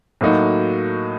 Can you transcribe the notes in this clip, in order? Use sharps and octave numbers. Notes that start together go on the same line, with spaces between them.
A2 F#3 A#3 D#4 F#4